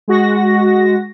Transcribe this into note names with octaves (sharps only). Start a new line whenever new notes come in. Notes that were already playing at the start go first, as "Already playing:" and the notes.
G#3 F#4 A#6